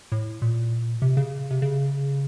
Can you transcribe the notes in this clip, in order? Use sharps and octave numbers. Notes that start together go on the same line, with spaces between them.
A2
A#2
C3
C#3
C3
C#3